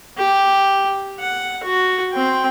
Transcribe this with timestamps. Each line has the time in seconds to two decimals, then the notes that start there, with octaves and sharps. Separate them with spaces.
0.18 G4
1.20 F#5
1.64 F#4
2.13 C4 G5